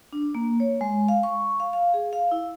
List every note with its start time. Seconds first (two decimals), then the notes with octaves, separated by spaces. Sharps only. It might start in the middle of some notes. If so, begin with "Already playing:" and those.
0.13 D4
0.35 A#3
0.60 C#5
0.81 G#3
1.08 F5
1.23 C#6
1.60 F5
1.73 F5
1.94 G#4
2.13 F5
2.31 E4